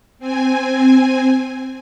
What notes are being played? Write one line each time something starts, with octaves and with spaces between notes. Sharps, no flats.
C4 G#5